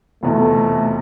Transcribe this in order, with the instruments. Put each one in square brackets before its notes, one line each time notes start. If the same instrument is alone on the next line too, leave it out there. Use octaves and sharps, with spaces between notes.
[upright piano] F1 E2 B2 [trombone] A3